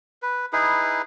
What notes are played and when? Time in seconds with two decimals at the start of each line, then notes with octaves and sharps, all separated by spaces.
0.22 B4
0.53 D#4 E4 G#4 B4